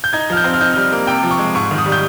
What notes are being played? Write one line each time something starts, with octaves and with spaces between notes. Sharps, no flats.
G6
D#4 G#6
F3 F6
G6
C4
F6
D#4 G6
F6
G3
A#3
C3 G5
F3
C#6
G#3
G#2 C#6
D#3
D#6
G3
G6